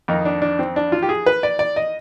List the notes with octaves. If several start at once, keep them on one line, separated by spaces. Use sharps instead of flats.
F2 D#3 D#4
D4
D4
C4
D4
F4
G4
G#4
B4
D5
D5
D#5